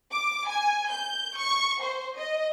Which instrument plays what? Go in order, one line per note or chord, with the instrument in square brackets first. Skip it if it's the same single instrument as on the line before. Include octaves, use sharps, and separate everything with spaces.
[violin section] D6
G#5
G6
C#6
C5
D#5